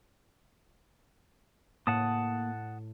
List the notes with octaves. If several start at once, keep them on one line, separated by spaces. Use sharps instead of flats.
A2 A#3 F#5 A5 D#6